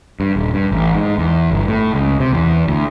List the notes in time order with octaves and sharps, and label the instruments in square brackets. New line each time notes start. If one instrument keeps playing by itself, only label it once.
[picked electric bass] G2
D#1
G2
A1
G#2
E2
G1
A2
C#2
C3
E2
D2